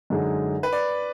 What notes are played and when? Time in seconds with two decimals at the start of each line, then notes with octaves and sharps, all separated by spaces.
0.10 F#2 D3 G#3 D#4 G#4
0.63 B4
0.73 D5